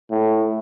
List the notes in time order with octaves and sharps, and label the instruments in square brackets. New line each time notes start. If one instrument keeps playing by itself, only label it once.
[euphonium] A2